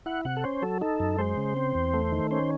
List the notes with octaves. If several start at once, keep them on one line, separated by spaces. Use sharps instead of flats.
E4 F#5
C3 F#5
A4
C#4 C5
F#3 A4
D#4 A4
F#2
G#3 C5
C#3
C4
E2
A3
D#3
C#4 C5